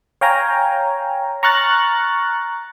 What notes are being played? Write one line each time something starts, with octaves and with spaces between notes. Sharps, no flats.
C#5 F5 G5 G#5 A#5
A#5 C#6 F6 F#6 A6